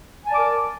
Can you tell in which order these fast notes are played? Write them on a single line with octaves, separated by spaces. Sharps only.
G#5 A5 D5 D6 A#4